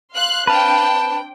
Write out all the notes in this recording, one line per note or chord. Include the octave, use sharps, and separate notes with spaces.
F5 C6 F#6
C4 D4 B4 F5 G5 A5